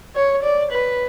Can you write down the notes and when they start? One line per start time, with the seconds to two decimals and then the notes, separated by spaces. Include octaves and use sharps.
0.16 C#5
0.43 D5
0.72 B4